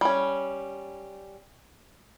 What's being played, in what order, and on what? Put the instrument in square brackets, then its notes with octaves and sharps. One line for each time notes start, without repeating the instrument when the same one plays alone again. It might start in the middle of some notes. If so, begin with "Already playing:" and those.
[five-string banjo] G3 C#4